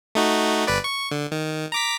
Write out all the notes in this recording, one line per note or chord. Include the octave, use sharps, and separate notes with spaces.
A3 D#4 F#4
G1 B4 D5
C#6
D3
D#3
A#5 D6 B6